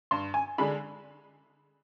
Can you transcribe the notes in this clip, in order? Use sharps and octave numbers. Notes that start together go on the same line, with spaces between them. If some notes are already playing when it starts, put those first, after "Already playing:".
G2 C6
G#5
D3 G#3 D4 B5